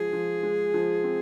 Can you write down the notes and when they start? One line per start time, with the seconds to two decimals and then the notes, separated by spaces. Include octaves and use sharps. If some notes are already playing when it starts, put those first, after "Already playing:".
Already playing: F3 G#3 G#4
0.13 F3
0.43 G#3
0.74 F3
1.04 C4